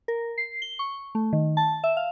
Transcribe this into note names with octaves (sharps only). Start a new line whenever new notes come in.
A#4
C7
G7
C#6
A3
D#3
A5
E5
F5